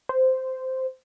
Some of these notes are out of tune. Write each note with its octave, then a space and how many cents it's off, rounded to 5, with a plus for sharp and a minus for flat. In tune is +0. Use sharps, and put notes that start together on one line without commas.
C5 -10